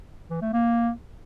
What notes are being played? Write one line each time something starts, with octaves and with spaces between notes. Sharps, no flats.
E3
A3
A#3